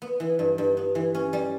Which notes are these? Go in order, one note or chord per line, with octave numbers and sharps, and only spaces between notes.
B3
E3
G2
G2
B3
E3
C#4
G3